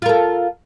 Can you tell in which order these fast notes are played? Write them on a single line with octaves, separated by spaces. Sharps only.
F4 A#4 A4